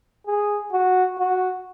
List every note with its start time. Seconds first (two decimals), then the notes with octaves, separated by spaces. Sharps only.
0.27 G#4
0.72 F#4
1.18 F#4